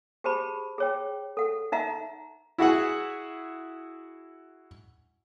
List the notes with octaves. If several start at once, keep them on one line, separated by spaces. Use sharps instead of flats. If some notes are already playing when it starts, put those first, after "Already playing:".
G4 G#4 C5 A5 B5
G#4 C#5 G5
A4 F#5
D#4 D#5 E5 F#5 A#5
E4 F#4 G#4 F#5